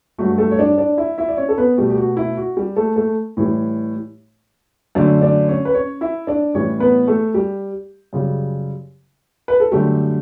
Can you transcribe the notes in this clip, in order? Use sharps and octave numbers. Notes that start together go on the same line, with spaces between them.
G2 F#3 A3 F#4
A3 A4
C#5
D4 D5
D4 D5
E4 E5
E4 E5
D5
C#4 C#5
A4
B3 B4
B2 G3 A3 G4
G4
F#4
E4
F#4
G3 G4
A3 A4
A3 A4
A2 E3 G3
F#2 D3 A3 D4 D5
D4 D5
C#4 C#5
B4
C#4 C#5
E4 E5
D4 D5
A2 E3 G3 C#4 C#5
B3 B4
A3 A4
G3 G4
F#2 C#3 G3
B4
A4
F#2 D3 G3 A3 G4